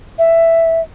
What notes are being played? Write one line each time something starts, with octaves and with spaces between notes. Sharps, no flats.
E5